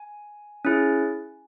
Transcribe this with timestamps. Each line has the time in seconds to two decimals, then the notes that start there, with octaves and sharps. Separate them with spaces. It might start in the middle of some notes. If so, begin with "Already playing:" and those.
Already playing: G#5
0.65 C#4 E4 G#4